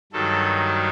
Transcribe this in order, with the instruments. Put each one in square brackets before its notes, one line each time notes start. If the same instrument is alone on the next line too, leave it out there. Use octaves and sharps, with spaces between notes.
[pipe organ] G2 D#3 F#3 A4